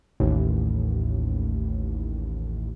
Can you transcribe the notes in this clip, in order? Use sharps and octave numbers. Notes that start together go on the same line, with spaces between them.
A1 D#2